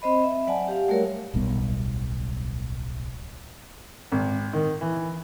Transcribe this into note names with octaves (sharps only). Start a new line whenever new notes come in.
C4 C5 D#5 B5
E5
F#3 D5 F#5 G#5 A5
G4 F5
G3 A3 F#4 A#4 C#5
D1 B1 G3 B3
G#1
D#3
E3